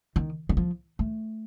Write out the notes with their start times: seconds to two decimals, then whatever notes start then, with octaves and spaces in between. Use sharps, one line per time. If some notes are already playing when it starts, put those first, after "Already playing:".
0.16 D#3
0.49 D#3
0.57 F3
0.99 A3